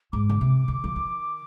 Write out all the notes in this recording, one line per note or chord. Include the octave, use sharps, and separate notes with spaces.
G#2 D6
D3
C3
D3
F3
D#3